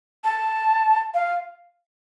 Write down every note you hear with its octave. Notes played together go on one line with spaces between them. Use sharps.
A5
F5